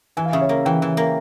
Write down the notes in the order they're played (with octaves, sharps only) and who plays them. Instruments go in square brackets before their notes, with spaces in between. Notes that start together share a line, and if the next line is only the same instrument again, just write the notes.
[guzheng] E3 [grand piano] G#5
[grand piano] F5
[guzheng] C#3 [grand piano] E5
[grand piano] C#5
[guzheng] A#3 [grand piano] F5
[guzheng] E3 [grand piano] G5
[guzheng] E3
A#3